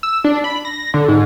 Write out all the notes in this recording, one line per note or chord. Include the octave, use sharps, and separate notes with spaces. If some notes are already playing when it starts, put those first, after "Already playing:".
E6
D4
B5
A#6
D3
G#2